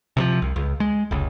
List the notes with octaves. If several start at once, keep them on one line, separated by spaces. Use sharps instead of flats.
C3 E3 F3
C2
C#2
G#3
F1 C#2